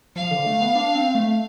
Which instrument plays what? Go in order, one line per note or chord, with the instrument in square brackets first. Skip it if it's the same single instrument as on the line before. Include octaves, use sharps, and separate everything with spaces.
[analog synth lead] F3 [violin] F5
[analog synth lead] D3
A3
B3
D4
C4
A3